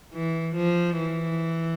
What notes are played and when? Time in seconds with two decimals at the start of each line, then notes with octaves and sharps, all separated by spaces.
0.14 E3
0.56 F3
0.99 E3